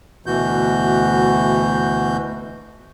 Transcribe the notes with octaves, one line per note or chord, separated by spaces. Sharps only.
D2 B2 E3 F#4 G6